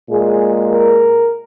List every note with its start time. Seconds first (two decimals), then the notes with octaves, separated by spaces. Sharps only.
0.10 A#2 G#3 G#4
0.71 A#4